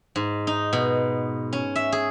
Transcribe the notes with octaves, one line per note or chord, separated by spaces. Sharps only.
G#2
D#4
B2
C#4
E5
G#4